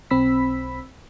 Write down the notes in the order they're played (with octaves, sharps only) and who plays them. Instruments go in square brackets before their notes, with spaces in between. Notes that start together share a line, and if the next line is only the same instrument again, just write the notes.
[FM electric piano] B1 C4 B5 E6 B6